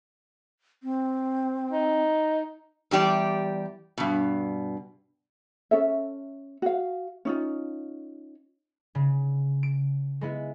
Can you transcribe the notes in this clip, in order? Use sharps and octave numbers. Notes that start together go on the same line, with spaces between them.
C4
D#4
E2 G3 G4 D5
G2 B2
C#4 A4 E5
F#4 F5
C#4 D#4 F4
C#3
D7
G#3 B3 E4